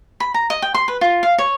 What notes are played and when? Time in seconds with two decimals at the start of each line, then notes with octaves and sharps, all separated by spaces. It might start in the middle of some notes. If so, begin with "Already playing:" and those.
0.20 B5
0.34 A#5
0.50 D#5
0.62 G5
0.74 C6
0.88 B4
1.01 F4
1.23 F5
1.38 C#5